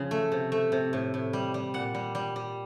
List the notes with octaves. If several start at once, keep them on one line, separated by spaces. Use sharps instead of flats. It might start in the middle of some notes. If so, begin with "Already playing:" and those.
Already playing: C#3 F3
A3
C3
A3
C3
A2
A2
G3
G3
A#2 F#5
G3
G3
G3